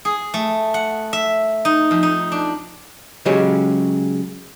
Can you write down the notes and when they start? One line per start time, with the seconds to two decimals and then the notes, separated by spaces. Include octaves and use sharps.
0.05 G#4
0.34 A3
0.74 F#5
1.13 E5
1.65 D#4
1.91 F2
2.03 D#4
2.32 D4
3.25 C#3 F#3 G#3 C#4 G4